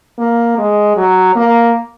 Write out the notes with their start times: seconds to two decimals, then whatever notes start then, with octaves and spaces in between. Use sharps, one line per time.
0.19 A#3
0.58 G#3
0.97 F#3
1.35 A#3